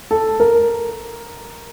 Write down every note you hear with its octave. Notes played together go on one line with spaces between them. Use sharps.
A4
A#4